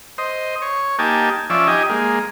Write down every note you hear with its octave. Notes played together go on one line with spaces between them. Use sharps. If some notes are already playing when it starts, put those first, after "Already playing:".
C5 D#5
C#5
A#3 D#4 G4 G#5 A5
F3 C#4 D5 E5
D#4 G4 D#5 G#5
G#3 A#3